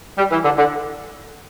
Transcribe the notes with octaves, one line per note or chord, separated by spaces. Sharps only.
G3
E3
D3
D3